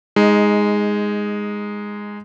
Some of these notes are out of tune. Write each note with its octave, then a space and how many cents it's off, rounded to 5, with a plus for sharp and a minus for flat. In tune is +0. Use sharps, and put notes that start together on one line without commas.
G#3 -5 D#4 +15